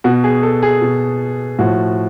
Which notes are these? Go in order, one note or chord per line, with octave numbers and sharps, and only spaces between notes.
B2 F#4
G#4
A4
G#4
B2
A2 F3 F#4